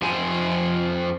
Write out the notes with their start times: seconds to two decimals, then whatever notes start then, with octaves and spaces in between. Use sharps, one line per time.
0.02 F2 F3 C4 C5 G#5